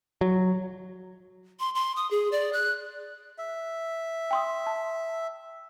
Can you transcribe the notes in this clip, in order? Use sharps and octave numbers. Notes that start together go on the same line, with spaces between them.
F#3
C6
C6
D#6
G#4
D5
F#6
E5
G5 C6 D#6
A5